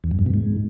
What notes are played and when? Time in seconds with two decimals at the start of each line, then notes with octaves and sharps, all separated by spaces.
0.04 E2
0.11 F#2
0.19 G2
0.26 B2
0.34 G#2